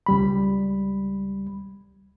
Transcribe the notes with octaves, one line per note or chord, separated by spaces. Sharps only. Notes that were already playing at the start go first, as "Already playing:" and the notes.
C#2 G3 B5